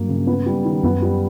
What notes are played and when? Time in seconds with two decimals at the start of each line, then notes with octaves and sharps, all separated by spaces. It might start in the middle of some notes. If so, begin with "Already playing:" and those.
Already playing: G2 F#3 A#3
0.09 C#3
0.27 B3
0.46 G3
0.65 D#3
0.84 F#2 B3
1.02 G3